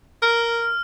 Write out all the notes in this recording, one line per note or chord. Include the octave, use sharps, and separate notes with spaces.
A#4 F6